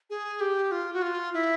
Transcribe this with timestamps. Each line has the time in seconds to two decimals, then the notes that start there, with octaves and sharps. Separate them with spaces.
0.10 G#4
0.41 G4
0.72 F4
0.94 F#4
1.02 F4
1.34 E4